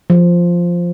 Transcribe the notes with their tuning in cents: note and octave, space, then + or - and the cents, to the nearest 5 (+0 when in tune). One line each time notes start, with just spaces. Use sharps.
F3 +0